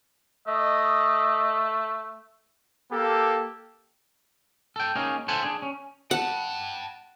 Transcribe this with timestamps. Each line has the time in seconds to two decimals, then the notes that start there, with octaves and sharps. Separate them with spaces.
0.48 A3 D#5
2.92 A#3 G4 A4
4.76 A4 G5
4.96 A#3 C#4 D#4 G#4 A#4
5.28 A4 C5 E5 F#5 G#5 A5
5.43 D4 G#4
5.62 C#4
6.11 F#5 G5 A5